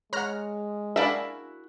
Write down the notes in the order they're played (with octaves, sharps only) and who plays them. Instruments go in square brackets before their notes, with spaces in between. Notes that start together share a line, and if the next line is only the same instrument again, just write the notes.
[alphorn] G#3 [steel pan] C#5 F#5 [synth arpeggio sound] A#5 F6
[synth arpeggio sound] D4 D5 [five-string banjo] E4 F#4 E5 [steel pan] G#4 A#4 F5